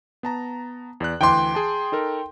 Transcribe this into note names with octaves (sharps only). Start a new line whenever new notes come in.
B3 A5 A#5
E2 D5 F#6
D2 E3 G5 C6 D6
G#4 A5
D#4 A4 A#4